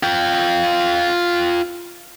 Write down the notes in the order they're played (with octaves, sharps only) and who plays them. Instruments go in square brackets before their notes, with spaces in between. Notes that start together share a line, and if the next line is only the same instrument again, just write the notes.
[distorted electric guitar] F4 G5